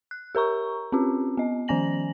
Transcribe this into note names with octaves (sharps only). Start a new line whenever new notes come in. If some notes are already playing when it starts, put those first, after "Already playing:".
F#6
G4 A#4 A#5 C#6
C4 C#4 F4 G4
B3 D#5
D#3 F3 C#4 G#5 A#6 F#7